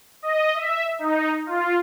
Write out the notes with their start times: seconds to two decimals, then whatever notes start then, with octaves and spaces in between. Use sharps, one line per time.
0.23 D#5
0.55 E5
0.99 D#4
1.46 F4